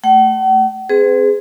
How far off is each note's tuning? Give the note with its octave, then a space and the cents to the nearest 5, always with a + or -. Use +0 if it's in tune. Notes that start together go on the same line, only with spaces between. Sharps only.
A3 +5 F#5 +45
C4 +0 G#4 +0 B4 +45